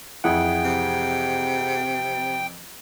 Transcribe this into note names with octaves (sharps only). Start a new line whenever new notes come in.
F2 E3 E4 G#4 F#5 G5
C3